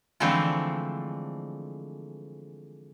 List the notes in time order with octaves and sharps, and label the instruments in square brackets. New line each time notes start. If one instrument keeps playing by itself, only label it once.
[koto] D3 E3 F3 G#3 A3 C4